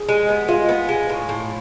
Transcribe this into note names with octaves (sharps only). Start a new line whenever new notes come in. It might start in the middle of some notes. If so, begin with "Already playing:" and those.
Already playing: G#4
G#3
B3
G#3 F4
B3
G#3
A2
A2